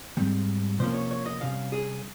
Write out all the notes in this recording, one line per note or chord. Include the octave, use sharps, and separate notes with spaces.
G#2 G3 C4
C3 F3 A#3 C#4 C5
C#5
C#5
D#5
C3 G3 C#4 F5
G#4